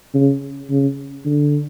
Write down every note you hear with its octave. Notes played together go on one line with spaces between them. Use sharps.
C#3
C#3
D3